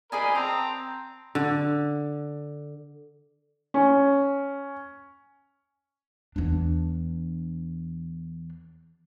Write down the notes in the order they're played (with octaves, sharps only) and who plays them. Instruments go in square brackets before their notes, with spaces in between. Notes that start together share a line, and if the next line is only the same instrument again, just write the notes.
[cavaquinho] G#4 D#5 G#5 [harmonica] A#4 D5 B5
[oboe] C4 [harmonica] A5 A#5 [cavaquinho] C6
[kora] D3
[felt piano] C#4
[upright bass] E2 D4